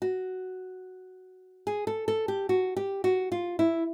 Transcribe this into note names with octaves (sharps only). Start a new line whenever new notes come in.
F#4
G#4
A4
A4
G4
F#4
G4
F#4
F4
E4